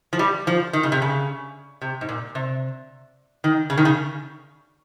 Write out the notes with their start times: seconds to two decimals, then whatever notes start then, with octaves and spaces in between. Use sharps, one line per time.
0.13 F3
0.19 G3
0.47 F3
0.73 D#3
0.83 C#3
0.92 C3
1.02 C#3
1.82 C3
2.01 G#2
2.09 A#2
2.35 C3
3.44 D#3
3.70 C#3
3.78 D#3
3.85 C#3